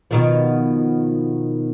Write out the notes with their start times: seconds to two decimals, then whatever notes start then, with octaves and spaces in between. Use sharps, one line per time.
0.11 B2 D#3 F3